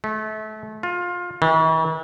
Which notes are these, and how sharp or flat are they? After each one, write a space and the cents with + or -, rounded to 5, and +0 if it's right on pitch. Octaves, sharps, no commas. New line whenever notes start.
A3 -30
F4 +20
E3 -45